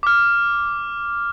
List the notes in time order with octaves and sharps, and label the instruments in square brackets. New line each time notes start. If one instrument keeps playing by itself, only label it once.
[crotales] D6 F6